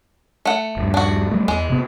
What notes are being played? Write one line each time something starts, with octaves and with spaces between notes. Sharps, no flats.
A3 F#5
D#1 G2
D4 F#4
F#3 G3 A3
E2 G#3
C3 B3